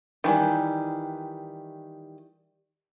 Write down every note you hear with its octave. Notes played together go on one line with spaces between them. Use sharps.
D#3 E3 G3